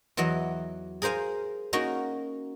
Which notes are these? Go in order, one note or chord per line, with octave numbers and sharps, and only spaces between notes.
E2 E3 F#3 D#5 F#5
G#4 A#4 C5 F5 G#5
A#3 C#4 D#4 F#4 A#4